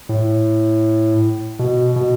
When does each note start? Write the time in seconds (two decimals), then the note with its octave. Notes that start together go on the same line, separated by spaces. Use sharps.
0.09 A2
1.59 B2
1.96 B2